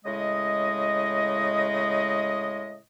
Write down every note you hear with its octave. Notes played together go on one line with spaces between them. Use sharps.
A2 C#3 G#3 D#5